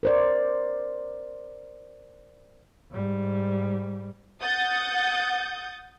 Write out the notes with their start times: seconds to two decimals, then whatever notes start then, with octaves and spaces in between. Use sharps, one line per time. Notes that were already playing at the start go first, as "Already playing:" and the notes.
0.03 A#4 C5 D5
2.90 G#2 G3
4.41 F#5 D#6 G6 A6